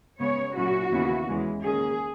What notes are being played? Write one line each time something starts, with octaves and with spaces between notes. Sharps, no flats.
C#3 G#3 B3 C#5
A#2 F#3 C#4 E4 F#4
D#2 C#3 E3 B3 E4
E2 C#3 E3 G#3
D#3 A#3 C#4 G#4